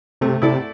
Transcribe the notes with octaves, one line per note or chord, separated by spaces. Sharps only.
C3 A3
C3 E4 A4 D5